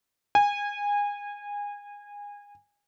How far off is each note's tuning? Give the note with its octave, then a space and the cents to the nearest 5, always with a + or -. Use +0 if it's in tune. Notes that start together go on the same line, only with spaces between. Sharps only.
G#5 -25